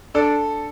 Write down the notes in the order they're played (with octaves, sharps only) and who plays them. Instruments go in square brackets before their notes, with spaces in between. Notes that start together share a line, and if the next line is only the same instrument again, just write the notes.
[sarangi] D4 [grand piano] A4